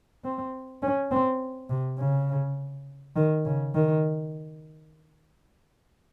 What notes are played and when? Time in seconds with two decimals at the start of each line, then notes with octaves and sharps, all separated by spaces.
0.24 C4
0.83 C#4
1.11 C4
1.70 C3
1.99 C#3
3.16 D#3
3.45 C#3
3.75 D#3